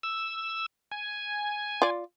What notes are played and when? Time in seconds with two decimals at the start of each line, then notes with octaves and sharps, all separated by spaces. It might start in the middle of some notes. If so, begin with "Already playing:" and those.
0.03 E6
0.91 G#5
1.82 F4 D5